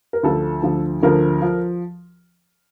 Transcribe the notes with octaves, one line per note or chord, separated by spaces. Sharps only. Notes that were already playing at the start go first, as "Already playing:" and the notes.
A#4
D2 D3 F3 A4
D2 D3 F3
D2 D3 F3 A#4
F3